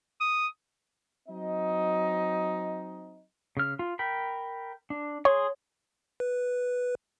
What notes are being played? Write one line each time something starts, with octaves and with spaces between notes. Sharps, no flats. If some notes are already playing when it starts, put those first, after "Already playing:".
D#6
F#3 C4 D#4 D#5
C#3 F6
F4
A#4 G5 B5
D4
G#4 C#5 C6
B4